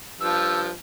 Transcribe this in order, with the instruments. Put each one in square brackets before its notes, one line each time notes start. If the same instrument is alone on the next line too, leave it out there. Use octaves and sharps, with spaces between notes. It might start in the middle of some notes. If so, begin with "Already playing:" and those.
[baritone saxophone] G2 [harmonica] F3 [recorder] E6